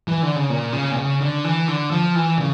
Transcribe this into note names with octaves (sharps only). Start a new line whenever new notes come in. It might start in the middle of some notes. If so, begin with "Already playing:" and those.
E3
D3
C#3
A#2
C#3
A#2
C#3
D3
E3
D3
F3
E3
C#3